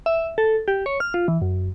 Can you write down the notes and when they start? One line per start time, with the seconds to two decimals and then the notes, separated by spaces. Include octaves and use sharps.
0.06 E5
0.38 A4
0.68 G4
0.86 C#5
1.00 F6
1.14 F4
1.28 E3
1.42 F#2